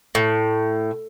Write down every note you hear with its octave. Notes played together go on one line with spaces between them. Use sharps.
A2